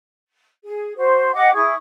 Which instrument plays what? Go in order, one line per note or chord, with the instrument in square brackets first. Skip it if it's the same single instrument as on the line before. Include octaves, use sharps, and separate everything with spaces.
[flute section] G#4
F#4 C5
G4 D#5 F#5 D6
E4 G#4 C#6 D#6